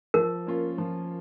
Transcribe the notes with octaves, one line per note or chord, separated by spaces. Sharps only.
F3 A#4
A#3 C#4 F4
F3